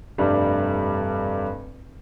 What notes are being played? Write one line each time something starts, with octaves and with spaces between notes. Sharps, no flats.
F1 G2 G3